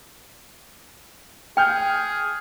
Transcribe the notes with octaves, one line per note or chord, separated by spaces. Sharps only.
G#4 G5 G#5 F6 G6